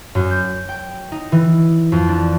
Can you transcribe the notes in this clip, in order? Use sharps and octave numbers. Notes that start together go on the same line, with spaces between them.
F#2
G6
G5
D#4
E3
F2
D4